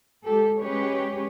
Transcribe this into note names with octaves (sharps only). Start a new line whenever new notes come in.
G#3 G4 A4
G#3 C#4 G4 G#4 B4 C#5